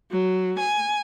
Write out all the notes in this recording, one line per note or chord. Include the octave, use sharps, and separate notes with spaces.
F#3
G#5